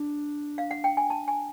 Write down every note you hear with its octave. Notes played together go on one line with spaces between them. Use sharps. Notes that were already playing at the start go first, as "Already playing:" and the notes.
Already playing: D4
F5
F#5
G5
G#5
A5
G#5